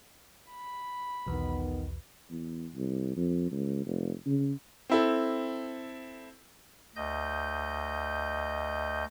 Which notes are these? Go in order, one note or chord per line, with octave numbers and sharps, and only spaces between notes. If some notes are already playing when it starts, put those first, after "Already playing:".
B5
B1 E2 D#3 B3
E2
C2
F2
C#2
F1
C#3
C4 E4 A4
D2 D#5 G6